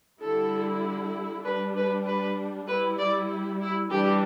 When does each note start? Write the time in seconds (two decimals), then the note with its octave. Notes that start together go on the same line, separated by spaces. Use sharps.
0.21 D3 G3 E4 A4
1.44 G3 D4 B4
1.76 B4
2.06 B4
2.68 G3 E4 B4
2.98 D5
3.60 E4
3.89 E3 G3 D4 G4